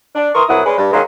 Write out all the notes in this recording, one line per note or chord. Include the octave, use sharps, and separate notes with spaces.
D4
E3 A#4 C6 C#6 D#6
C2 F#3 E4 B4 F#5 D#6
G3 G#3 C#4 B4
G2
D#3 F#3 G#3 A#3 C#4 D#4